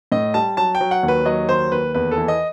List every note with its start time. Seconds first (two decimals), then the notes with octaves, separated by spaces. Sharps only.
0.12 A2 D#5
0.34 G3 A5
0.57 F#3 A5
0.75 G5
0.81 F#3
0.91 F#5
1.03 D#2
1.08 B4
1.25 F#3 D#5
1.49 D#2 C5
1.71 D#2 B4
1.94 E2 B4
2.11 A4
2.17 E3
2.28 D#5